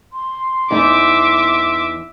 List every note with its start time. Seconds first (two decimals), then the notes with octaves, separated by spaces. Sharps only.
0.13 C6
0.71 E2 D#4 E5 D6